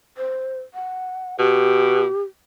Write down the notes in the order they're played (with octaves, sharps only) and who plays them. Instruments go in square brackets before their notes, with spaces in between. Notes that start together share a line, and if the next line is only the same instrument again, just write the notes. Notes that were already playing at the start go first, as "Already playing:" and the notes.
[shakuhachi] C5
F#5
[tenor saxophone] B2 [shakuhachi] G4